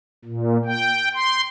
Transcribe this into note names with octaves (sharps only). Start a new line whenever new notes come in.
A#2
G5
C6